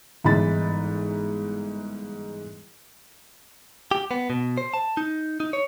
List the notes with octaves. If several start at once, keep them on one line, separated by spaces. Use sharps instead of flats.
G1 G#2 E3 D#4 B5 A6
G4
B3
B2
C5
A5
D#4
D#4
C#5